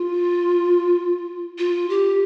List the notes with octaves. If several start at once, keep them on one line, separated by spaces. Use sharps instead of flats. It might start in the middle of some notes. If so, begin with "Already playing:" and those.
Already playing: F4
F4
G4